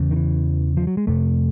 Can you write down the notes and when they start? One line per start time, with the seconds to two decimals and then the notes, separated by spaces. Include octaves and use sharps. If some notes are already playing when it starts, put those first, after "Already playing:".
Already playing: E2 C#3
0.11 D#3
0.16 E3
0.77 F3
0.87 F#3
0.97 G#3
1.07 F2 C3 A3